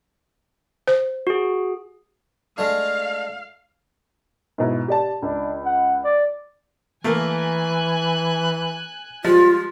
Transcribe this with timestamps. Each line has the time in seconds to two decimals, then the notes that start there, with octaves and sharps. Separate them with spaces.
0.87 C5
1.27 F#4 G#4
2.58 G#3 A3 D4 F5
4.58 G#2 B2 E4
4.88 G4 D5 A5
5.22 C#2 D4
5.65 F#5
6.04 D5
7.04 E3 A3 A#3 A#4 G#5 F#6
9.24 F3 G3 G#3 F4